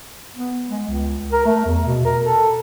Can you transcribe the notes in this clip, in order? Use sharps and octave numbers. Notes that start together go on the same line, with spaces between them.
B3
G#3
C#2
A#4
A3
E2
B2
A#4
A4